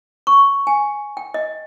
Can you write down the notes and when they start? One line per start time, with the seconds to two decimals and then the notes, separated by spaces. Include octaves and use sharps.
0.27 C#6
0.67 G#5
1.17 G5
1.34 D#5